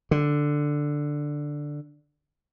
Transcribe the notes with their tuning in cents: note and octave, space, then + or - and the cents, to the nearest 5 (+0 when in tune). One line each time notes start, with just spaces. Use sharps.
D3 +5